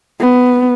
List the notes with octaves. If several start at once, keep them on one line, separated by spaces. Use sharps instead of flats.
B3